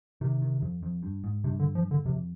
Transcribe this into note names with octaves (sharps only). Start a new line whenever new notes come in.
C3 D#3
D#3
F2
F2
G2
G#2
G2 C3
D3
F3
D3
F2 C3